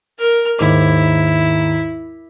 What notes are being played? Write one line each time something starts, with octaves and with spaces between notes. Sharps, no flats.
A#4
D#2 G#2 E4 D6